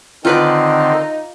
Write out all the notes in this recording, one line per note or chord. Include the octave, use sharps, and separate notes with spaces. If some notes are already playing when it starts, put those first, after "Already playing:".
D3 D#3 C4 D#4 F4 B4 D5